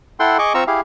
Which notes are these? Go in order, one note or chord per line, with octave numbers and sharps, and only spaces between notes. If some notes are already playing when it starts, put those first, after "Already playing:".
E4 A4 F#5 G5 C6
G#4 D#5 C#6 D6
C4 F4 A#5 C#6 E6
E4 G4 G#4 F5